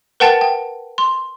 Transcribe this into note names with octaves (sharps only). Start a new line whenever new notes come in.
A#4 B4 F#5 G5 A5 A6
G5
C6